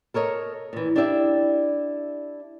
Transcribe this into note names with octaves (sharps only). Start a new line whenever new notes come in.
A4 A#4 C#5 D#5
A#2 E3
D4 E4 G4 D5 E5